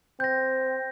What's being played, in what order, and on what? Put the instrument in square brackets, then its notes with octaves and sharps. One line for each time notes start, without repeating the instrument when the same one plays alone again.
[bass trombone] C4 [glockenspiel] G6 A#6